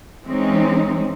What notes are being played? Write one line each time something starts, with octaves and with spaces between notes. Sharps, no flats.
E3 G#3 C4 C#4 D#4